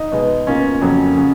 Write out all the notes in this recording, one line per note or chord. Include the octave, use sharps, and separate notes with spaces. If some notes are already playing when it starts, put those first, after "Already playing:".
Already playing: D#4
B2 G#3 B3
B2 A#3 C#4 F4
F2 C#3 F#3 A#3
C#3 F#3